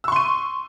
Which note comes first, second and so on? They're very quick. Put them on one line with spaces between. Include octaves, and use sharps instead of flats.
E6 C#6 C6 D#7